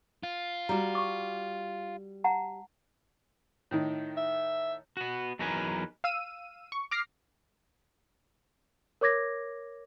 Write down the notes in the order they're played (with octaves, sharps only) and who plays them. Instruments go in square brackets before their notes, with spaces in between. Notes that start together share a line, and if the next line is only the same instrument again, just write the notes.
[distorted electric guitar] F4
[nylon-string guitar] G3 F#4 [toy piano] A#5
[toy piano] C#6 D6
F#5 A5 A#5
[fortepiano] A2 D#3 D#4
[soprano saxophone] E5
[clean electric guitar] B3 F#4
E2 F#3 D#4 A#4 B4 G#5
[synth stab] F5 E6 D#7
C#6
D6 F6 A#6 C7
[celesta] A#4 C#5 D6 G#6 A#6